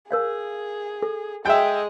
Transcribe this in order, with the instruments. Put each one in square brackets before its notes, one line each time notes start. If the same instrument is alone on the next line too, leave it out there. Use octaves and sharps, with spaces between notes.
[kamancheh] G#4 [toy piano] A#4 C#5 F5
[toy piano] A4
[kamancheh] G#3 D#5 [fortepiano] E5 G5